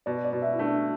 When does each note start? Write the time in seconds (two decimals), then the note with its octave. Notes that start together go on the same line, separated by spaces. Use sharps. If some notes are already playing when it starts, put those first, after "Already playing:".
0.06 B2 D5
0.24 D5
0.33 B2
0.42 E5
0.53 E4
0.59 A3 D4